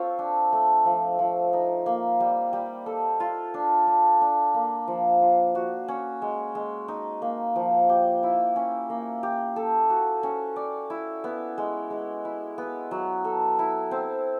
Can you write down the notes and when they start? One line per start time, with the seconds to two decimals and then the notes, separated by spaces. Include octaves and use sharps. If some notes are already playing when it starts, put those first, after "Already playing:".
Already playing: C4 F4 A4 C#5
0.19 D4
0.52 A3
0.85 F3
1.19 F3
1.53 D#4
1.86 A#3
2.20 G3
2.53 G3
2.86 A4
3.20 F4
3.54 D4
3.87 D4
4.21 D4
4.54 A#3
4.88 F3
5.21 F4
5.55 F#4
5.88 C#4
6.22 G#3
6.55 G#3
6.88 D#4
7.22 A#3
7.56 F3
7.89 G4
8.23 E4
8.56 C#4
8.90 A#3
9.23 G4
9.56 A4
9.90 F#4
10.23 C#4
10.56 D5
10.90 E4
11.24 B3
11.58 G#3
11.90 G#3
12.25 E4
12.58 B3
12.91 F#3
13.25 A4
13.59 E4
13.91 C4